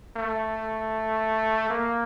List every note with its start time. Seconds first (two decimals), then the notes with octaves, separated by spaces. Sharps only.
0.16 A3
1.70 A#3